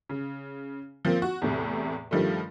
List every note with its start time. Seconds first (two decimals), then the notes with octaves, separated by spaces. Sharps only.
0.09 C#3
1.05 F3 A#3 C4
1.22 F#4
1.42 E2 A2 C3
2.11 G2 D#3 F3 G3 A3